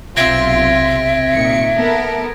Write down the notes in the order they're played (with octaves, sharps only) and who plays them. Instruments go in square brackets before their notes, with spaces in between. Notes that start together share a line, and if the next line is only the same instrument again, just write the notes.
[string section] B1 F4 [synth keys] C3 C4 [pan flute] E5 [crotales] G#6 A#6 D7
[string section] A#2 D#3 C#7
B3 A4 A#4